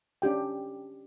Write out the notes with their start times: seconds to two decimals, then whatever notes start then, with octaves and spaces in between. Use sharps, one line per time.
0.22 C#4 D4 G4 G5